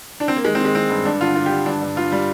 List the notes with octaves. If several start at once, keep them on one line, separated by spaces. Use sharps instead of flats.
D4
C4
A#3
D#3 G#3
C4
D#3
G#3
D#3 C4
G2
G2 D4
D3 F4
D3 F4
G4
D3
G2 D4
G2
G2 F4
G3